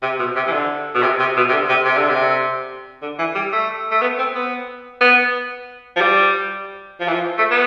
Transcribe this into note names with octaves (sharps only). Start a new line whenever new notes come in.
C3
B2
C3
E3
D3
B2
C3
C3
B2
C3
D3
C3
C3
D3
C3
D3
E3
G3
A3
A3
B3
C4
B3
B3
F3
G3
F3
E3
F3
A3
B3